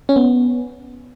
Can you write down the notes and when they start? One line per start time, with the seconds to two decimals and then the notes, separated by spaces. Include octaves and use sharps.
0.09 C#4
0.16 B3